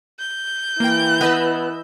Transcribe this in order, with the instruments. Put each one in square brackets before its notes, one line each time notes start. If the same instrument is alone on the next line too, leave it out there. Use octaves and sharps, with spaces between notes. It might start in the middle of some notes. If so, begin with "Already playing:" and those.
[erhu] G6
[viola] E3 [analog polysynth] A#3 G5
[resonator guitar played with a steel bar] B3 [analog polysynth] B4 D#5 E6